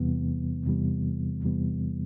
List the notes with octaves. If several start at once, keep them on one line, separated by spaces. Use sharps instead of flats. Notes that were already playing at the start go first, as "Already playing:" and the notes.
Already playing: E2 C3 E3 G3 B3
E2 C3 E3 G3 B3
E2 C3 E3 G3 B3